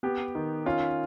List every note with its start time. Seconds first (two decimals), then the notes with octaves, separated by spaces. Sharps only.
0.03 B3 G4
0.35 D#3
0.66 C#4 F4